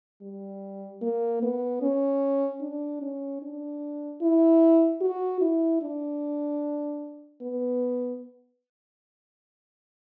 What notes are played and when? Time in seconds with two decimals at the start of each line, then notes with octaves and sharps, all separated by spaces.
0.22 G3
1.02 A#3
1.42 B3
1.82 C#4
2.61 D4
3.02 C#4
3.42 D4
4.22 E4
5.01 F#4
5.41 E4
5.82 D4
7.42 B3